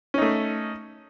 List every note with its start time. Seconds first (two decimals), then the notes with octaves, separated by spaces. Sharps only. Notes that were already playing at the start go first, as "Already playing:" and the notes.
0.14 C#4
0.18 D#4
0.22 A3